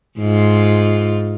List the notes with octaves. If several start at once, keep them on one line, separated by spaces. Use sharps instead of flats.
G#2 F4